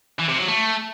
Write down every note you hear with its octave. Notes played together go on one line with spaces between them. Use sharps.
E3
C3
F#3
A3